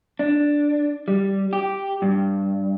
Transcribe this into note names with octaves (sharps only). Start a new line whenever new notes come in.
D4
G3
G4
G2